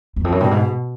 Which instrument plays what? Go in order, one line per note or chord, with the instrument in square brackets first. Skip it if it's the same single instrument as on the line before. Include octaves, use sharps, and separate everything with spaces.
[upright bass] E2
F2
F#2
[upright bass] G2 [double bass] B2
[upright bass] G#2